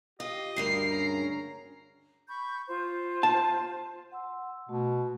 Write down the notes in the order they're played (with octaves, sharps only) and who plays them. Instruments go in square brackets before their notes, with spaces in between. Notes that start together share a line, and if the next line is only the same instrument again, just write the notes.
[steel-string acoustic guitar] F4 [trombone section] G4 [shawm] D#5
[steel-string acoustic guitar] D2 G2 A#4 [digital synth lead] C7
[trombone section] C#3 A#3 C#4 [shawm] A#5
[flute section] B5 C#6 G6
F4 C5
[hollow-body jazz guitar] A5
[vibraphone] F#5 C6 E6
[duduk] B2 [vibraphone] A3 F#4 A5